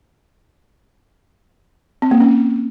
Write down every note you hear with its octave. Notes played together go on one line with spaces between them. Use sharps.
C4
A#3
C#4